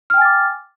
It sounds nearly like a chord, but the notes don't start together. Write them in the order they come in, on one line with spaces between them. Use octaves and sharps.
F6 G5 G#5 A6 D6